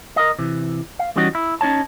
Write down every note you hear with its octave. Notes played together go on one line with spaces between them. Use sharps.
A#4 D#5
C3 E3
F5
E3 G3 C#4 D#4 F#4
E4
C#4 D#4 C#5 A5